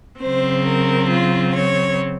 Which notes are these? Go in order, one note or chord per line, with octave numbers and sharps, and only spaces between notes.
C#3 F#3 C4 C5
A#4
F4
C#5